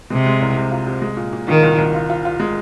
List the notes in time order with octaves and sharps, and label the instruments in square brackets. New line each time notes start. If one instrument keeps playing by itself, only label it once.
[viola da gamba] C3 [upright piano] G#3
[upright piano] G#3
C2
C3
F4
C3
G#3
A#2
A#2
[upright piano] A#2 [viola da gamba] D#3
[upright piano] C2
C2
F4
F4
F4
G#3